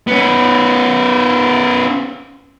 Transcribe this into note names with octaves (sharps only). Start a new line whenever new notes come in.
B3 C#4